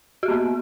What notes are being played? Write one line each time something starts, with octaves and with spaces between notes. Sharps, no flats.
A#3 B3 F#4 G4